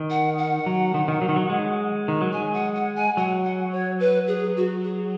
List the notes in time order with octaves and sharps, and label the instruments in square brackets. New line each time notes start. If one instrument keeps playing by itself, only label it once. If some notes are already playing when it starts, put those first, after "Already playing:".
Already playing: [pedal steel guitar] D#3
[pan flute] F#5
F#5
[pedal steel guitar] F#3
D#3
D#3
F#3
D#3
F#3
G#3
D#3
F#3
[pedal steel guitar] G#3 [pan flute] G#5
[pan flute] F#5
F#5
G#5
[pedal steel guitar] F#3 [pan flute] F#5
[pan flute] F#5
C#5
B4
G#4
F#4
G#4